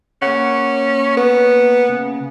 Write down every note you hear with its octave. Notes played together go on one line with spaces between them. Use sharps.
A#3 C#4 F#5
B3
C#3